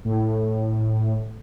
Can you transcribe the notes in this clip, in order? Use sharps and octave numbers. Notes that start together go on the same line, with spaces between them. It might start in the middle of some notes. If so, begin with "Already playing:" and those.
A2